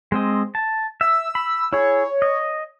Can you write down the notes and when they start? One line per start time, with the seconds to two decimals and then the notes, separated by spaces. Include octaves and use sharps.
0.12 G#3 C4 D#5
0.55 A5
1.01 E5 E6
1.35 B5
1.72 E4 G#4 C#5
2.22 D#5